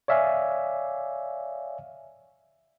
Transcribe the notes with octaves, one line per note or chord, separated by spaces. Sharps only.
C#5 D5 E5 F5 G#5